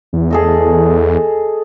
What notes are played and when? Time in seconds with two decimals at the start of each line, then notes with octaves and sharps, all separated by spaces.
0.13 E2
0.31 G#4 A4 D#5